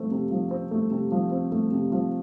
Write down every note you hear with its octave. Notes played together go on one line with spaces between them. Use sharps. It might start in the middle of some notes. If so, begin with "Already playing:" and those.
Already playing: F3 A3 C4
C3
F3
C4
A3
C3
F3
C4
A3
C3
F3